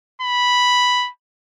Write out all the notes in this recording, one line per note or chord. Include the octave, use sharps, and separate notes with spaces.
B5